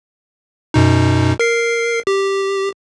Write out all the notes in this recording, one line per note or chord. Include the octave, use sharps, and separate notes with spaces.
F#2 B2 D#4
A#4 C7
G4